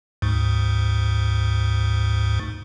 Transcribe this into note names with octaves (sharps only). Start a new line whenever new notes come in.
D2 G#2